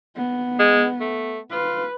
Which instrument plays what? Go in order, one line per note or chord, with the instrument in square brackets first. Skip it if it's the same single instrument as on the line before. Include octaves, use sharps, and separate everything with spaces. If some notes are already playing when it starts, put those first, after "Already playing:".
[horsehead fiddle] B3
[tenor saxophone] G#3
A3
[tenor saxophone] F4 [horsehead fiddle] B4